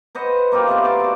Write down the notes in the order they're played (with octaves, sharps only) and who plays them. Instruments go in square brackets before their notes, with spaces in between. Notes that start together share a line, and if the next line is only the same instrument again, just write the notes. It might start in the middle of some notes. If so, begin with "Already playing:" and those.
[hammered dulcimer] B4 C5 D#5 F#5
A#3 D#4 F4 G4
A3 B3 C4 D4
D5 A5 C6
D#4 F#4